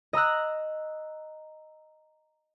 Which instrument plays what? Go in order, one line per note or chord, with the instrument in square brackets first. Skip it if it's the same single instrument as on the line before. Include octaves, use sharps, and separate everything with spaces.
[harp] D#5 A#5 E6 F#6